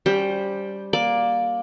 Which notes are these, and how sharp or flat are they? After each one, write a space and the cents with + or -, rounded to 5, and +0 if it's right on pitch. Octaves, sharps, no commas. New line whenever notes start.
G3 +0 C#4 +25 C5 +10
A#3 +15 D5 +0 D6 +0